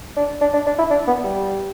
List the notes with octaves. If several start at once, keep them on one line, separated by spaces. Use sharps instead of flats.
D4
D4
D4
D4
E4
D4
B3
G3